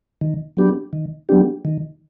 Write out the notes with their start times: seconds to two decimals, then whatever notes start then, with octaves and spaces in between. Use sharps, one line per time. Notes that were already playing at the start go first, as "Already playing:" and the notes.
0.21 D#3
0.57 F#3 B3 D4 G4
0.93 D#3
1.29 F#3 B3 D4 G4
1.65 D#3